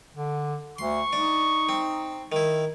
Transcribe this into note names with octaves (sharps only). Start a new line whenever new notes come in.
D3
D2 C6 C#6
D4 D#4
C4
D#3 E4